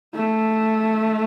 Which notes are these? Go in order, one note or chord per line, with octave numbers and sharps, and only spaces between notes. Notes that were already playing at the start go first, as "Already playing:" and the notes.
A3